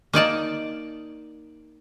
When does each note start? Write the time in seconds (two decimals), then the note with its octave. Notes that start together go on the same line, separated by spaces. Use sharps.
0.13 A#3 D#4 D5 A5